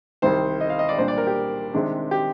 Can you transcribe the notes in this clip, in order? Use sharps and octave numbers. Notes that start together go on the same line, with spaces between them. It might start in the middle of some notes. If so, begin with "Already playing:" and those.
C2 C3 D#3 C5
D#5
F5
D#5
D5
A#2 G3 D4 C5
D5
A#4
G4
C3 D#3 G#3 D4
G4